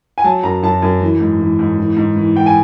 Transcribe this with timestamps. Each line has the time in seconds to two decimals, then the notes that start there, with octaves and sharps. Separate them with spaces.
0.18 G#5
0.24 F#3 A5
0.43 F#2 A#5
0.63 F#2 A5
0.82 F#2
1.01 E3
1.20 G#2
1.40 E3
1.59 G#2
1.78 E3
1.97 G#2
2.16 E3
2.36 E3 G5
2.46 G#5